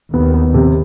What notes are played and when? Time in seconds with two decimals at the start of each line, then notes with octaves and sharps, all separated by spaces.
0.13 D#2 D#3 B3
0.34 B3
0.54 C3